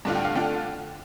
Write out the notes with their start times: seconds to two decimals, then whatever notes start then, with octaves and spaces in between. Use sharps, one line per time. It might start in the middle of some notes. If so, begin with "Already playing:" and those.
0.05 G2 D3 A3 D4 F4 A5
0.15 G5
0.25 F5
0.35 D3 A3 D4 F4 G5